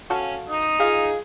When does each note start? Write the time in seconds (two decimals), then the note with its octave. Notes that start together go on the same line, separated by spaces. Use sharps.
0.10 C#4 F#4 A4 F5
0.49 D#4 D#6
0.80 F4 G#4 F5